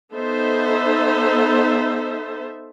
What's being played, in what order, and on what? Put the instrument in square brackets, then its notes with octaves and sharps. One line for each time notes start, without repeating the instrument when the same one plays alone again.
[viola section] B3 D#4 A4 C5 E5